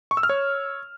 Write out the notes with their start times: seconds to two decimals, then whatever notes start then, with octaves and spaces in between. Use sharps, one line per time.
0.11 C#6
0.17 E6
0.23 F6
0.29 C#5